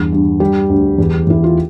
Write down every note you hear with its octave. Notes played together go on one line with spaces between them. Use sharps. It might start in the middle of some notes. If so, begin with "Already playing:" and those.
Already playing: E2 G2
G2
G3 G4
D2
E2
E2 E4
F4